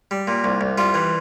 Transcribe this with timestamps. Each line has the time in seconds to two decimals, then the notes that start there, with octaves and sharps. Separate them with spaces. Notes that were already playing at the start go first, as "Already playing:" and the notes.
0.11 G3
0.27 A#2
0.44 C2
0.61 C2
0.78 G3 F4
0.94 E3